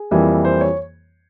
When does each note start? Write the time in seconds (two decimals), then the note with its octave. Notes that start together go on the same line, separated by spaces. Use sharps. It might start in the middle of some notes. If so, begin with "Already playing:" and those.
Already playing: G#4
0.11 F2 E3 G3 A#3
0.45 C5
0.61 C#5